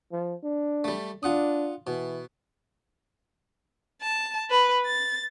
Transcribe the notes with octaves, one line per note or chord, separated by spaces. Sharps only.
F3
D4
G3 A3
D4 F4 F#5 D#6
B2 E3
A5
B4
A6